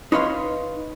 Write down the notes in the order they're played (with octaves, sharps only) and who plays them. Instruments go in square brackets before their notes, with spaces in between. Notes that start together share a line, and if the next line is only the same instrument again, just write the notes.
[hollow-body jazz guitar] D#4 B4 C#5 F5 C6